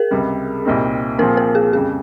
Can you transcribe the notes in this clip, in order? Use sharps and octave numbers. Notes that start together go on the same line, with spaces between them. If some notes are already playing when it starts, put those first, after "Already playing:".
Already playing: G#4 A#4
C#2 C3 G3
C2 A#2 G3 C4 D#4
A#2 F3 C4 F4 G#4 A#4
A#4
G#4
F2 C#3 G3 G#4